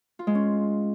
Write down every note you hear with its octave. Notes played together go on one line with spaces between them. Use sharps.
F4
G#3
C#4